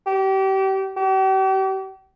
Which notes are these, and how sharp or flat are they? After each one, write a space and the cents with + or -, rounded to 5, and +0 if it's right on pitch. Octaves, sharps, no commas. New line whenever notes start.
G4 -30
G4 -40